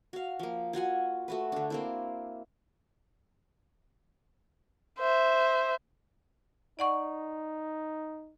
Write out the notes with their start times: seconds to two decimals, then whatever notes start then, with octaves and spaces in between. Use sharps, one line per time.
0.13 F#4 F5
0.39 F3 A#3
0.73 F4 F#4 F#5 G#5
1.28 A3 F#4 B4
1.52 D3 D4
1.70 A#3 C4 E4
4.99 C5 E5
6.79 D#4 D5 F#5 C#6